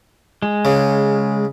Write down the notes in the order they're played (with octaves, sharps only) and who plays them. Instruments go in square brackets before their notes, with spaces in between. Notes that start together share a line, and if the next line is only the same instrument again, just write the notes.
[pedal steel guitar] G#3
[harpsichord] C#3